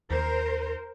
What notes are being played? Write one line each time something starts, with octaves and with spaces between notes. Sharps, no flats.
D#2 A#4 C5